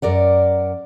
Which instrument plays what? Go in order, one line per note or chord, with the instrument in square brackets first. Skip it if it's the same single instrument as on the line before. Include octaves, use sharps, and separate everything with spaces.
[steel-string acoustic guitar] F#2 A#4 D5 F#5